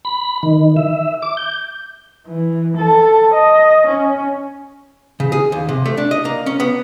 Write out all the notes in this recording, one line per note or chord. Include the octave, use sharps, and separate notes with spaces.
B5
D#3
E5
D6
G6
E3
A4
D#5
C#4
C#3
G#4
D#2
C3
A3
D4
D#5
A#3
C#4
B3